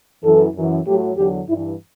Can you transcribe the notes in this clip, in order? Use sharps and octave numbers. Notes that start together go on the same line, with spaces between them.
F#2 E3 A4
F#2 E3
A2 F#3 G4
E2 D3 F#3 G4
G2 E4
E3